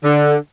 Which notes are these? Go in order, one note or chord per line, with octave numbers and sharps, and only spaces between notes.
D3